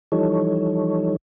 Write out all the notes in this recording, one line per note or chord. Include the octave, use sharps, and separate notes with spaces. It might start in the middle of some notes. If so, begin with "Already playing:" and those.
E3 F3 G3 D#4 A4 C#5